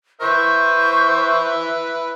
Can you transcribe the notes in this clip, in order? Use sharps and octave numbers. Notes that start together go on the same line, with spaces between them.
B4 C5 E5 C#6